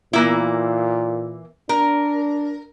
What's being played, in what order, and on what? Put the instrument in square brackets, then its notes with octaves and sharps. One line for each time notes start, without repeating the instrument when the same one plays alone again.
[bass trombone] A#2 [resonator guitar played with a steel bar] E3 A#3 E4
[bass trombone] D4 [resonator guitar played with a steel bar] A#4